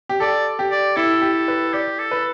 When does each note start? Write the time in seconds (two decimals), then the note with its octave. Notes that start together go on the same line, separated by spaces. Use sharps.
0.09 G4
0.20 A4 D5
0.59 G4
0.72 D5
0.96 E4 A4
1.22 G4
1.48 B4
1.73 G4 D5
1.99 A4
2.11 B4